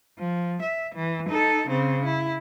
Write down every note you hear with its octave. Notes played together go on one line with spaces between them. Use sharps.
F3
E5
E3
D#4 A4
C#3 C4
E4